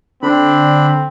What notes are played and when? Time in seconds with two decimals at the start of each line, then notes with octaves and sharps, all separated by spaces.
0.22 D3 C4 D4 B5